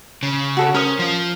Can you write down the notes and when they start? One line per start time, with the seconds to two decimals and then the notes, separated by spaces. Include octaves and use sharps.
0.23 C#3
0.57 F#4 A4 C#5
0.74 C#4 A#4 C5 D#6
0.99 F3 F4